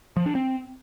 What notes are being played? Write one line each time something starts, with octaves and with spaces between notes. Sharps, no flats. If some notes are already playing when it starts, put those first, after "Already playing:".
F3
D4
C4